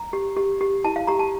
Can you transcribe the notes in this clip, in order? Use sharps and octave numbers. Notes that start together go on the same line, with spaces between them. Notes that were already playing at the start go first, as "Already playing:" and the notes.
Already playing: A#5
G4
G4
G4
E4 A5
F5
G4 A#5
A5